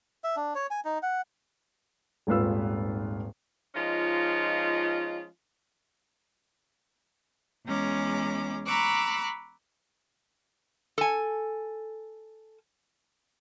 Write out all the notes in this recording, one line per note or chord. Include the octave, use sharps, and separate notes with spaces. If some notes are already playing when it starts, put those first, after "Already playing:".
E5
D4
C#5
G#5
D#4
F#5
D#1 G#1 G#2 F4 B4 E6
F3 G#3 C#4 D#4 F4
E2 G#3 C#4 A#5 D6
A#5 B5 C#6 D6 E6 F#6
A4 G#5